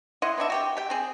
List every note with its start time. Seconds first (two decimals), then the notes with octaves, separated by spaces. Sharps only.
0.22 E4 D#5 F#5 C6
0.37 B3 C4 D4 E5
0.50 F#4 G4 G5
0.77 G4 G5
0.90 C4 G#4